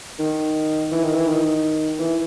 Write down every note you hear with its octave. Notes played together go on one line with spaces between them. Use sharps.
D#3
E3
D#3
E3
D#3
E3